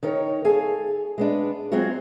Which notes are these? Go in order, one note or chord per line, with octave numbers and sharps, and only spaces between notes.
D#3 D#4 A#4 C#5
G#4 A4 F5 G#5
G#3 B3 D4
F#3 G#3 C4 F4 F#4